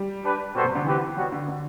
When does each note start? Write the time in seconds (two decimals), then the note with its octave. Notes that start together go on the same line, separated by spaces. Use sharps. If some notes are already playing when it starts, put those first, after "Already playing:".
Already playing: G3
0.23 D4 G4 B4
0.54 B2 G3 B3 F#4 A4 C5
0.64 C3
0.75 D3
0.85 E3 C4 G4 B4 F#5
1.16 F#3 G3 B3 F#4
1.32 D3
1.48 D3